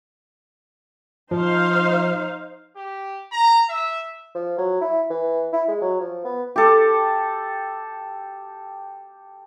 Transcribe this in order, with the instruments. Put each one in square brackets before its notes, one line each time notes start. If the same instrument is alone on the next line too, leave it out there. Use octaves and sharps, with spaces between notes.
[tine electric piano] F3 [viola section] D#4 C5 F5
[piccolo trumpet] G4
A#5
E5
[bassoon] F3
F#3
E4
E3
E4
G#3
F#3
F3
B3
[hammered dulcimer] G4 A4